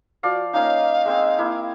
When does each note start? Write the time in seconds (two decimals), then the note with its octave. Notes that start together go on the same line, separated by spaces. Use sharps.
0.23 F3 F#4 D5 F5
0.53 A#3 C#4 D#4 F5
1.06 G#3 C4 G#4
1.38 A#3 E4